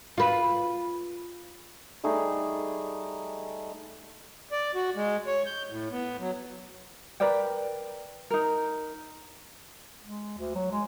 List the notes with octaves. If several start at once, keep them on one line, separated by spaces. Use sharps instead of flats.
F4 B4
G3 A3 D#4 G#4
D5
F#4
G#3
C#5
G6
A2
B3
F#3
A#4 B4 D5 G5
D#4 A#4
G#3
D2
F#3
G#3